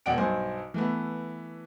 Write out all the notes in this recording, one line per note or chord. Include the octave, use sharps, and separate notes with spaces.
E1 B2 D5 F#5 G5 D7
B1 G2 C5 G#5
E3 A3 B3